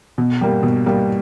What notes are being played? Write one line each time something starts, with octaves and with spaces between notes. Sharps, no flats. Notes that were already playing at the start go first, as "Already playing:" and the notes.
B2
G3 A#3
B2
G3 A#3